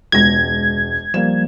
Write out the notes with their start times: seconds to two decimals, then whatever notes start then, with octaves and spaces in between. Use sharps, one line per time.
0.12 E1 C#2 G#6 A#6
1.14 F3 G3 A#3 E7